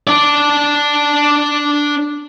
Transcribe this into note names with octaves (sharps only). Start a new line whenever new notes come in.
D4 D5